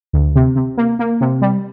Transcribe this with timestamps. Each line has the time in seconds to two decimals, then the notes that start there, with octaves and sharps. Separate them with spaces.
0.13 D2
0.35 C3
0.56 C3
0.78 A#3
0.99 A#3
1.21 C3
1.42 G3